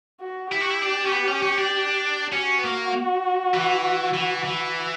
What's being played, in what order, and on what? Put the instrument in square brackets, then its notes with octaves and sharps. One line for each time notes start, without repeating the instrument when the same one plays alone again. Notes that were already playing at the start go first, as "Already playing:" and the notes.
[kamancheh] F#4
[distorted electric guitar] E4 [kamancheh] G4
[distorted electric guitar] F#4
E4
D4
C#4
B3
C#4
C#4
D4
[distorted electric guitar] C#4 [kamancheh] F#4
[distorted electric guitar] B3
A#3
E3
E3
E3